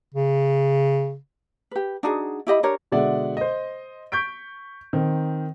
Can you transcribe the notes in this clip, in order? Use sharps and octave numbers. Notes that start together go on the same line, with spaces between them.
C#3
G4 B4
D4 D#4 F#4 G#4
E4 G4 D#5 B5
D4 G4 A#4 C#5
B2 D3 G#3 D5 E5 F#5
C5 D#5
C#6 G6 B6 D7
D#3 C4